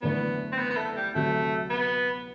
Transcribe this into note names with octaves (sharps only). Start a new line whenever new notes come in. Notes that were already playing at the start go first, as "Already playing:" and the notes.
F#1 E2 D3 A3 B3 D4
C4
B3
B3
A3
G3
D2 C3 F#3 A3
B3